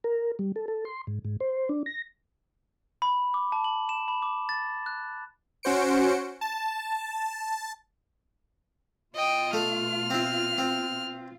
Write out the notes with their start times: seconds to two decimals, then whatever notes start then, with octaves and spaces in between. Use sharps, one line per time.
0.04 A#4
0.39 G3
0.56 A4
0.68 A4
0.85 C6
1.07 G#2
1.25 G#2
1.40 C5
1.69 D4
1.86 A#6
3.02 B5
3.34 D6
3.52 A5
3.64 F#7
3.89 E7
4.08 B5
4.22 D6
4.49 A6
4.86 F#6
5.63 C#4 F#4 C5 C#7 D7
6.41 A5
9.15 B2 F4 D#5 G5
9.53 A3 F6
10.10 C4 E4
10.58 C4